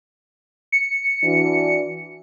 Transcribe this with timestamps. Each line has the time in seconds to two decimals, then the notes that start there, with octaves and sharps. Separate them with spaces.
0.72 C#7
1.23 E3 D4 F#4